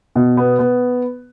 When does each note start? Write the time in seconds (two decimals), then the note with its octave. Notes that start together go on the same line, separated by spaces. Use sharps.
0.16 B2
0.37 B3
0.59 B3